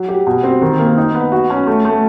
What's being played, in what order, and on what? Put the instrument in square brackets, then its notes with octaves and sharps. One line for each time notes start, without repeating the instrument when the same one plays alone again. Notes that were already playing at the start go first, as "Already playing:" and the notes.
Already playing: [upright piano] F#3
G4
B2
C4
D#3
A#3
D#4
B3
F#4
C#4
A3
A3